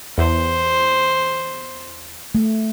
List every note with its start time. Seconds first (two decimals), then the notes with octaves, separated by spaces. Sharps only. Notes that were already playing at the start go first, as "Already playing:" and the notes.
0.18 E2 C5
2.35 A3